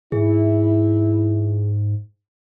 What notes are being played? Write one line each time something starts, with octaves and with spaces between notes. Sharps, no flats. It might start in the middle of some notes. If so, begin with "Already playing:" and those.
G#2 E4 G#4